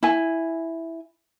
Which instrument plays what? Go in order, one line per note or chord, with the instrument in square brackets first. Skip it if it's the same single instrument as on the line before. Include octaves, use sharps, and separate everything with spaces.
[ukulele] E4 G#5